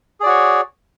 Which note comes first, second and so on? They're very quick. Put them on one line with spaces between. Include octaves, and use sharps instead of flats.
G#4 D5 F#4 C#5